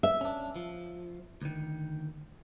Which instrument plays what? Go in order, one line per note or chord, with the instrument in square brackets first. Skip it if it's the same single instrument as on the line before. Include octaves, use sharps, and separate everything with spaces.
[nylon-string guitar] E5
[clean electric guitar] C#4 D4
F3
D2 D#3